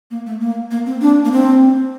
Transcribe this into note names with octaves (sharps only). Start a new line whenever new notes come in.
A#3
A3
A#3
A#3
C4
D4
A#3
C4